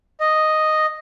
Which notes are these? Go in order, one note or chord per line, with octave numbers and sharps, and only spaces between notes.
D#5